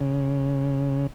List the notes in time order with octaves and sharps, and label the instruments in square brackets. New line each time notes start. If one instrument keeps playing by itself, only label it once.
[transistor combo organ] C#3